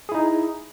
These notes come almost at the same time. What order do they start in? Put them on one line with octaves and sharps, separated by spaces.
G#4 E4 D#4